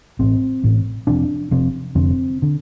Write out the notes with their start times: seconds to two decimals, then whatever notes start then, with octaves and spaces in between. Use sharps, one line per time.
0.19 A1 A2 C4
0.64 A1 A2
1.07 F1 F2 C3 D4
1.51 F1 F2 C3
1.95 F1 F2 D3 C4
2.42 D3